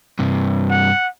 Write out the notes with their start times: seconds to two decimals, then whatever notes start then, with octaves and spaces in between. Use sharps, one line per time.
0.19 G2 C3
0.70 F#5